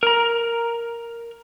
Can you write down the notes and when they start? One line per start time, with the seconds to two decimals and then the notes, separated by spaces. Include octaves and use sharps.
0.03 A#4 A#5